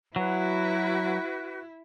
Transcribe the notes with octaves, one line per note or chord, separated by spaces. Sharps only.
F#3 E4 F#4 B4